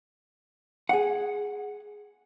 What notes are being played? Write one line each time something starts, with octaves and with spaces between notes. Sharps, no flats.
G#4 F#5